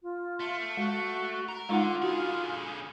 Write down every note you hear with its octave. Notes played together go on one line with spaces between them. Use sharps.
F4
A3
G#3 F#4
A#4
D3 G#3 D#4 F4 F#5
D3 F#4 G#4